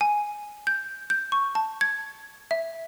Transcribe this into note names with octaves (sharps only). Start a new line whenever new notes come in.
G#5
G6
G6
C#6
A5
G#6
E5